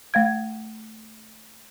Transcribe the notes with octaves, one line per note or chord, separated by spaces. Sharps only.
A3 F5 G#6